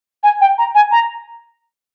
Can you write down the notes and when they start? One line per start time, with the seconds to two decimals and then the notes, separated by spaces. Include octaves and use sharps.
0.23 G#5
0.41 G5
0.58 A#5
0.75 G#5
0.92 A#5